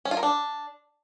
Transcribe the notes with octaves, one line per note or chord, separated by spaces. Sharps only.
C#4
F4
A#4
D4